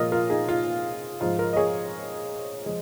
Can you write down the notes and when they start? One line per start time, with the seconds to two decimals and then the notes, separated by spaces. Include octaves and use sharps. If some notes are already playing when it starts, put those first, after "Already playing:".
Already playing: A#2 F3 G#3 F4 A#4 D#5
0.12 F4 A#4
0.30 D#4 G#4
0.48 F4
1.20 G#2 F3 G#3 F4
1.39 F4 A#4
1.53 D#5
1.56 G#4 C#5
2.66 F3 G#3